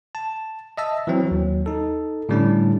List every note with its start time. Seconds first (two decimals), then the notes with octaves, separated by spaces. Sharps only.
0.15 A5
0.78 D#5 E5 A5 E6
1.07 E3 F#3 C4
1.27 D#2 F#3
1.66 D#4 A4
2.29 A2 D3 G3 C#4 D4